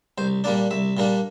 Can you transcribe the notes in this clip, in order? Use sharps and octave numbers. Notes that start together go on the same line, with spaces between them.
C2 C5
A#2 G3 A#3 D4 D5
C2 E5
A#2 G3 A#3 D4